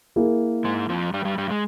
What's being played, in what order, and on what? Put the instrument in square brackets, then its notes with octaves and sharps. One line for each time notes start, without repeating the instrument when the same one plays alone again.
[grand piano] A#3 E4 G#4
[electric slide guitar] G#2 G#3
F2 F3
G2 G3
G2 G3
G2 G3
G#3